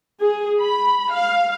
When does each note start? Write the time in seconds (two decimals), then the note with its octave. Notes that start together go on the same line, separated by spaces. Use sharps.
0.21 G#4
0.61 B5
1.12 F5